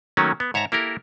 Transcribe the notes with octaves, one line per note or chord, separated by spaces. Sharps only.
D#3 F#3 A3 A#3 C#4
B3
G#2 C#5 E5 A5 A#5
A#3 E4 G4 A4 A#4